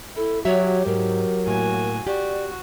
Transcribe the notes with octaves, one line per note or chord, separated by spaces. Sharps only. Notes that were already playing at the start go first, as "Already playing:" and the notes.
E4 A4
F#3 F#4 G4 C#5 E5
G#2 F#3 A#4
A2 A#3 F#4 G#5
F#4 G4 D5